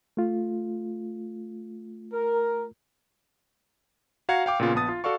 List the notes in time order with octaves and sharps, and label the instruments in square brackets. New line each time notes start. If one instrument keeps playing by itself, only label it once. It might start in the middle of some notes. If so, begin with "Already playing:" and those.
[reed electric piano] A3 F4
[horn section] A#4
[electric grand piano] F#4 F5 F#5 A#5 G#6 C#7
F5 G5 D6
A#2 C#3 B3 F4
A#1 B3 A5 D#6 A6
F4
F#4 A4 D5 F5 C#6